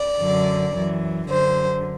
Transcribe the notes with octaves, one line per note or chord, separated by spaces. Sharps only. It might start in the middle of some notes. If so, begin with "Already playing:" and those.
Already playing: D5
F#2 D3
F#2 E3
F#2 D3 C5